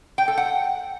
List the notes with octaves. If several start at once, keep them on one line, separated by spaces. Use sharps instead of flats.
G5
A4
F#5